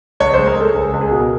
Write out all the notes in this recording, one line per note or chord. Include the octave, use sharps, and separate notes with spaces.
C#2 C#5
G#3 C5
A#4
G#3 A4
C#2 G#4
C#2
G#4
B2
A#4